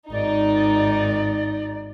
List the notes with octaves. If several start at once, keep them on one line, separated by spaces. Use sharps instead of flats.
G#1 D#4 D5